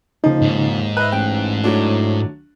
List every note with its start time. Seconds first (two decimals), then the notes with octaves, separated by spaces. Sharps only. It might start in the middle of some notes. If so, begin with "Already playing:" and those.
0.24 D#2 C#3 F3 D#4
0.42 G#2
0.97 B4 D#5 E5 F#6
1.12 A1 G5
1.64 A2 F#3 A3 D4